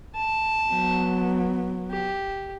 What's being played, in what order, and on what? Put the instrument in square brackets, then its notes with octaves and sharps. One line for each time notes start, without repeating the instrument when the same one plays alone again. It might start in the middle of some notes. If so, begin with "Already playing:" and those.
[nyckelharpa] A5
[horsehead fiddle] F#3 B3
[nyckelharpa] G4